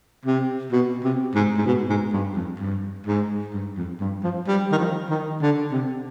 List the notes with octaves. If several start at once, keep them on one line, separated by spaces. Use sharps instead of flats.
C3
B2
C3
G#2
G#2
B2
G#2
G2
F2
G2
G#2
G2
F2
G2
F3
G3
D#3
F3
D#3
D3
C3